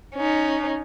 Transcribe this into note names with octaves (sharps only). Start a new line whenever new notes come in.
C#4 D#4